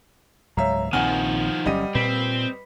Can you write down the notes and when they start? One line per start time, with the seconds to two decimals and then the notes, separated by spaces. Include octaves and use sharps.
0.57 C#2 G#2 F#3 C#5 E5 F5 A#5
0.93 A#1 D#2 D#3 F3 C4 F#5 G#5 F6
1.66 G1 F#3 G3 C#4 D#5 D#7
1.95 A#2 C4 B4 B5 B6